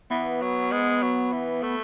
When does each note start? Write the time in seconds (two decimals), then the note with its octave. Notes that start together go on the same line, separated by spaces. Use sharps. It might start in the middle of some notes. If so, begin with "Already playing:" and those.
0.10 E3 B3
0.41 F#3
0.72 G#3
1.02 F#3
1.32 E3
1.63 A3